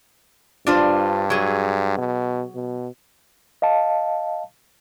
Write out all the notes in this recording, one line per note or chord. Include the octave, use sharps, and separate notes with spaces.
G2 D4 F4 C5
F#3 G#4
B2
B2
D#5 F5 A5